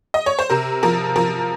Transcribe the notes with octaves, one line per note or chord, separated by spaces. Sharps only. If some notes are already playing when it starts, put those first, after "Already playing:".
D#5
C#5
C5
C3 A#4
F3 A#4
F3 A#4